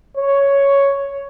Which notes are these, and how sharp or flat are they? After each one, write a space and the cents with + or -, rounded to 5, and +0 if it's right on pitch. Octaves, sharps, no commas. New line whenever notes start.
C#5 +5